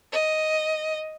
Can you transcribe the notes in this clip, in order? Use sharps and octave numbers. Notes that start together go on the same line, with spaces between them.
D#5